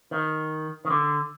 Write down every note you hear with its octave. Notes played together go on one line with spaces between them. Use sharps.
D#3
D#3
D3